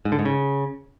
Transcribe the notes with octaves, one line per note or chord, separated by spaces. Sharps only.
G#2
D3
G#2
C#3